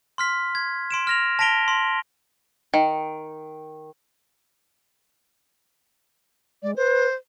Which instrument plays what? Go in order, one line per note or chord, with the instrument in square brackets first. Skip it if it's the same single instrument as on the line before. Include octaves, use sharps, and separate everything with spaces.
[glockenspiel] C6 F6 B6
G#6
C6 D7 E7
F6 A#6 F7
A5 A#6 B6 D7 F7 G7
C6
[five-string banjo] D#3
[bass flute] G#3 [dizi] D5
[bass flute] B4 [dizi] C5